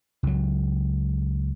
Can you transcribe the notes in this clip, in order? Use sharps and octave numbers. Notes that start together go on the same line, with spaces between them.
C#2 F#3